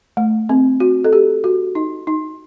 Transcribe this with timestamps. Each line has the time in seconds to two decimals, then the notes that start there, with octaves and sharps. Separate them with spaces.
0.17 A3
0.49 C4
0.80 F#4
1.04 A4
1.13 G4
1.44 F#4
1.75 D#4
2.07 D#4